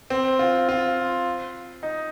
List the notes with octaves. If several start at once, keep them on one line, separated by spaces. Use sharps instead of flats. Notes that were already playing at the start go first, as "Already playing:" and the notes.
C4
F4
F4
D#4